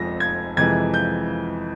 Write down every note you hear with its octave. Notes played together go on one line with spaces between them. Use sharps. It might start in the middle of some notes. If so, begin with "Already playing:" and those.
Already playing: F1 F2 F3 G#3 A#6
G#6
F2 C3 E3 G#3 G#6
G6